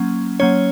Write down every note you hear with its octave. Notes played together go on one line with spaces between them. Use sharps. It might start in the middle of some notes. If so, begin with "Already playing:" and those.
Already playing: F#3 A#3 C#4
F#3 A#3 C#4 C#5